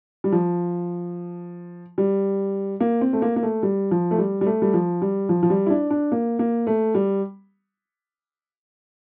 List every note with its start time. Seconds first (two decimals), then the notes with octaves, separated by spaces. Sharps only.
0.24 G3
0.32 F3
1.98 G3
2.80 A#3
3.01 C4
3.13 A3
3.22 A#3
3.36 A#3
3.43 A3
3.63 G3
3.91 F3
4.11 A3
4.18 G3
4.41 G3
4.46 A3
4.62 G3
4.74 F3
5.02 G3
5.29 F3
5.43 F3
5.50 G3
5.66 E4
5.70 D4
5.91 D4
6.12 A#3
6.39 A#3
6.67 A3
6.95 G3